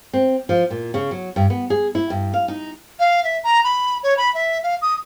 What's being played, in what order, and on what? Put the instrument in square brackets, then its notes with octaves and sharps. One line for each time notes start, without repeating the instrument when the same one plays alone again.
[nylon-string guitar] C4
F3
A#2
C#3
F#3
G2
B3
G#4
E4
G2
F5
D#4
[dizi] F5
E5
A#5
B5
C#5
B5
E5
F5
D#6